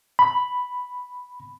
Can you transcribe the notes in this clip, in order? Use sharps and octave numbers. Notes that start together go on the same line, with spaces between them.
B5